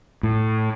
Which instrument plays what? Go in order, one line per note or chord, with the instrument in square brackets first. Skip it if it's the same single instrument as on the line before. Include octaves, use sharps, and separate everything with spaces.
[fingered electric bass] A2